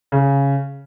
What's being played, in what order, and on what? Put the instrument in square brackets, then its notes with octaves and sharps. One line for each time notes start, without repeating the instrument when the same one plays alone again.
[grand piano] C#3